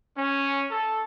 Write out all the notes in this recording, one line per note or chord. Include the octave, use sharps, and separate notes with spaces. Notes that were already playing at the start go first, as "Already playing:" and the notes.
C#4
A4